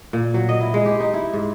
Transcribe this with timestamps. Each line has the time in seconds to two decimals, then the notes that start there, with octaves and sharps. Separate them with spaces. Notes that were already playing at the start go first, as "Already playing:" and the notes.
0.13 A#2
0.34 F#3
0.49 D#5
0.61 E4
0.74 G#3
0.86 G4
1.00 D#4
1.14 E4
1.33 G#2